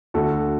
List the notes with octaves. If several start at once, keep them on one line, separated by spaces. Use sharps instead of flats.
D2 F#4 A4